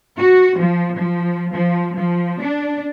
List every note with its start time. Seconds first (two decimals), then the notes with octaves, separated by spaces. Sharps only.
0.18 F#4
0.58 F3
0.98 F3
1.53 F3
1.98 F3
2.42 D4